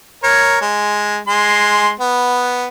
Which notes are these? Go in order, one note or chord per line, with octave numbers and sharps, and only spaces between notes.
A#4 C#5
G#3
G#3 C6
B3